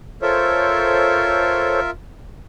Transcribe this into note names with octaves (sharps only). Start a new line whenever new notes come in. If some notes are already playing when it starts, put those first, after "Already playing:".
F4 A4 A#4 C5 C#5 E5